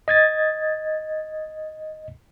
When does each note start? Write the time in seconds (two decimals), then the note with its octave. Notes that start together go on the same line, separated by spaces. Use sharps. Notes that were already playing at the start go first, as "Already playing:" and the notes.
0.08 D#5 G#6 A6